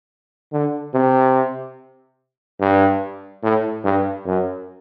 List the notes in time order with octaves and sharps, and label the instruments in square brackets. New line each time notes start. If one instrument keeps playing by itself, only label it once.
[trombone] D3
C3
G2
A2
G2
F#2